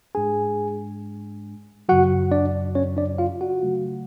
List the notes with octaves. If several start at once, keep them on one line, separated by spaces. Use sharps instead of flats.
G#2 G#3 D4 G#4 G#5
F#2 C#3 F#3 F#4 F#5
D4 D5
C#4 C#5
D4 D5
F4 F5
F#4 F#5
C#3 F#3 A3